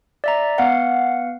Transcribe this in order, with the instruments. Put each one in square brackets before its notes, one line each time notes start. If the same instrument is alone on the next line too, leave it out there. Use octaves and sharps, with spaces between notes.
[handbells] D5 E5 A#5
B3 F5 F#5